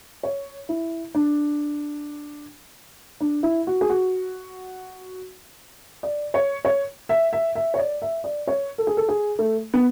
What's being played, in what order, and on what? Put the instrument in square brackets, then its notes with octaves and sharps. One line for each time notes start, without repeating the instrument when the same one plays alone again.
[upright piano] C#5
E4
D4
D4
E4
F#4
G#4
F#4
D5
C#5
C#5
E5
E5
E5
C#5
D5
E5
D5
C#5
A4
G#4
A4
G#4
A3
B3